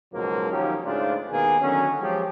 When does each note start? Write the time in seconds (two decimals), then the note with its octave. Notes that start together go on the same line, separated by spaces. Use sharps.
0.13 C#2 G#2 B2 F3 F#3 A#3
0.50 D#3 F3 F#3 C#4 D#4 G4
0.85 G#2 C#3 A3 D4 F4 C5
1.29 D#2 B2 D#3 A#3 B3 G#4
1.61 D3 D#3 F#3 C#4
2.00 F3 F#3 G#3 G4